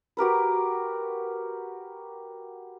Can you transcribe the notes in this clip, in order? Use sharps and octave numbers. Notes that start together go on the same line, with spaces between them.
F#4 G4 A#4 B4